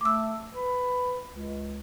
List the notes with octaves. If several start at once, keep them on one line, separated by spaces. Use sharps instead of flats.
A3 D6 E6
B4
C#2